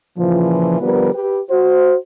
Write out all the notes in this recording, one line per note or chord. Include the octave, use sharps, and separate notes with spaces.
A#2 C#3 E3 F3
D3 F3 G3 B3 A#4 B4
G4 B4
F#4 C5